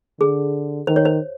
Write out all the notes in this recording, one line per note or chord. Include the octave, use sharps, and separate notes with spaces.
D3 G#4
D#3 C5
C#5
C5